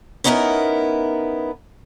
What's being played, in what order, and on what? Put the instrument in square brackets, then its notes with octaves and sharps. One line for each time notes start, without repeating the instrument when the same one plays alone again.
[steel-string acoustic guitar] B3 C#4 D#4 E4 F#4 A#4